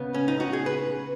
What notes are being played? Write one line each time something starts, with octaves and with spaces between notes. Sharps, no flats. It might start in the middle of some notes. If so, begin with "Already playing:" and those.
Already playing: C#3 B3
C#4
D#4
F#4
G#4
B4